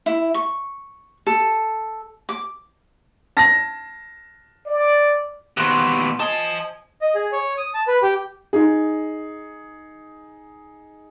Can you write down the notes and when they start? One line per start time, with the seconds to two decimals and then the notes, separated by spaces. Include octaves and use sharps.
0.06 E4
0.34 C#6
1.27 A4
2.29 D6
3.37 A5 A#6
4.67 D5
5.57 D#2 B2 C5 F#5
6.20 C5 D#5 G#5 A5
7.01 D#5
7.15 G#4
7.32 C#5
7.58 D#6
7.74 A5
7.87 B4
8.02 G4
8.53 D#4 G#4